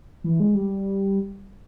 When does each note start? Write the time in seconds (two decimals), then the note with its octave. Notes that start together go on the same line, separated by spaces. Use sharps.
0.24 E3
0.40 G#3
0.55 G3